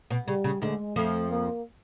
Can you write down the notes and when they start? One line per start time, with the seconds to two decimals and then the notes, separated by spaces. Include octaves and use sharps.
0.11 B2
0.27 C#3 G3
0.44 C#3
0.62 D2 D3 G#3
0.96 F2 F3 A3
1.31 A#3